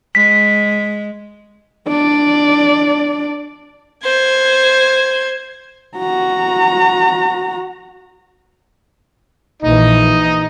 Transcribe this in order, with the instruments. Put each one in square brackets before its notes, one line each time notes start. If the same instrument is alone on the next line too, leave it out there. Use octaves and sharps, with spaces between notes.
[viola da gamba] G#3 [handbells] B6
[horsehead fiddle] D4 D5
[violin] C5 G#6
[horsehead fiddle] F#4 A#5
[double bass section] A#1 E3 [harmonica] D#4 D#5